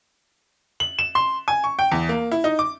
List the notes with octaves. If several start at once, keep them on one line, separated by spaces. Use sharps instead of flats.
F#7
E7
C6
G#5
C#6
G5
E2
A#3
E4
D#4
D6